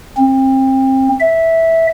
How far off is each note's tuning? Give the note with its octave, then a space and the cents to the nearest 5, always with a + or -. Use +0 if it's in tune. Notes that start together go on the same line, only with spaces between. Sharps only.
C4 +30
E5 -10